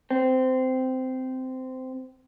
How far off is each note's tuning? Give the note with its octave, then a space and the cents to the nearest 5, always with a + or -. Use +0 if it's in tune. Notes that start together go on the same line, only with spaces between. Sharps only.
C4 -15